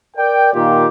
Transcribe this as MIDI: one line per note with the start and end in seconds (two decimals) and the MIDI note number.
0.17 0.49 70
0.17 0.49 74
0.17 0.49 79
0.53 0.87 46
0.53 0.87 51
0.53 0.87 65
0.53 0.87 67